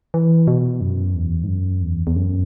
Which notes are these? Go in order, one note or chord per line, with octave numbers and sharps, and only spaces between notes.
E3
B2
F#2
E2
G#2
F#2
E2
E2
F#2